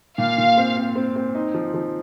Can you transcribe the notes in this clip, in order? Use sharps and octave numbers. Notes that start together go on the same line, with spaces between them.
A#2 F5
A#2
C4
C4
C4
C4
D#4
F3
F3